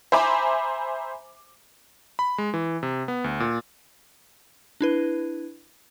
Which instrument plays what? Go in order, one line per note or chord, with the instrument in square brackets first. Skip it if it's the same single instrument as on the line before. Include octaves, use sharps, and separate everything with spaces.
[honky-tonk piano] C5 E5 G#5 A#5 B5 D6
[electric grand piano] B5
G#3
E3
C3
B3
D2
A#2
[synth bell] D4 E4 B4